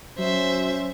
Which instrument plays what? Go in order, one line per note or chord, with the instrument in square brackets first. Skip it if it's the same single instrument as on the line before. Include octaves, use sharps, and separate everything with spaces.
[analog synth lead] F#3 [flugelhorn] C#4 [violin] C5 E5